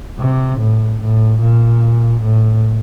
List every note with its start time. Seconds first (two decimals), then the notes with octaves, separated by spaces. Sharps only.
0.19 C3
0.59 A2
1.00 A2
1.40 A#2
2.22 A2